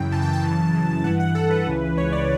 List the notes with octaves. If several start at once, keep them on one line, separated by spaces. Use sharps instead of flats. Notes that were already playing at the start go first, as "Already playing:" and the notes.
Already playing: F#2 C#3 E3 G5
F#2 C#3 E3 A5
G5
A5
F#2 C#3 E3
F#2 C#3 E3
G2 E3 F#5
F#5
G2 E3 A4
B4
C#2 C#3 E3
C#2 C#3 E3 C#5
D5